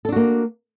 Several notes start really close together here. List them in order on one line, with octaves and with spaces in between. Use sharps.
A4 D4 F#4 A#3